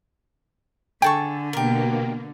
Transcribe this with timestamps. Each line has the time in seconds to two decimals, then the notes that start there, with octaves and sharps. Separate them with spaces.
1.02 D3 G#4 A4 G5 C#6
1.53 B2 A#3 G4 A#4